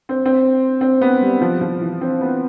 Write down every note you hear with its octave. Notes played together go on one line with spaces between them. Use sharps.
C4
C4
C4
B3
G3
F3
F3
E3
C4
B3